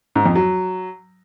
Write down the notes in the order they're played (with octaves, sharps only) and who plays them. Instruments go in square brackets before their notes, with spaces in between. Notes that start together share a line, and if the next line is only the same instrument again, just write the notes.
[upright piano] G#2
F2
F#3